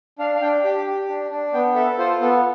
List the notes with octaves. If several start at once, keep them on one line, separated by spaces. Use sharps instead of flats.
D4 F5
F5
D4 G5
G4 G5
G4
D4
D4
B3 G5
A4 E5
F4 C5
B3 A4